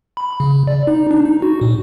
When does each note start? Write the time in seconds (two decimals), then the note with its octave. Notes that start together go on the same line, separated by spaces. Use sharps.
0.17 B5
0.40 C#3
0.67 D5
0.87 D#4
1.11 D4
1.25 D#4
1.42 F#4
1.61 A#2